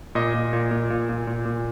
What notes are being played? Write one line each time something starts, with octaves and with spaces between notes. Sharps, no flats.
A#2 D#5
A#2
A#2
A#2
A#2
A#2
A#2
A#2